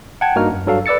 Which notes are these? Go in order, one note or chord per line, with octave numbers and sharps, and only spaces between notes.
F#5 G5 A5 G#6
G2 A#3 D#4 F#4 F6
F#2
G2 F#3 A4 F5
B4 D5 E6 A6 C#7